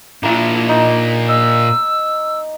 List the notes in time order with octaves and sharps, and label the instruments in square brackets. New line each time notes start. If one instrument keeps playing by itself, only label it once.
[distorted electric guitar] A#2 D4 [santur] A#3 E4
[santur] D#4
[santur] D#5 [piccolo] E6